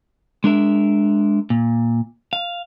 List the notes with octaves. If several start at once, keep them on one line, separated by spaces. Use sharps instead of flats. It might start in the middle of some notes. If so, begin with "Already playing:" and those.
G#3 D4 A#4 E5
A#2
F5